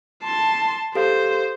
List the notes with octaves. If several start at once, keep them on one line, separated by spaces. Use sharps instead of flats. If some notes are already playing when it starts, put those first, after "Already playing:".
A5 C6
G4 A4 C5 F5